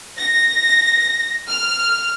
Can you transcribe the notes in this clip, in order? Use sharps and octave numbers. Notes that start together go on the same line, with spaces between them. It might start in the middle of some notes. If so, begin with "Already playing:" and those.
A#6
F6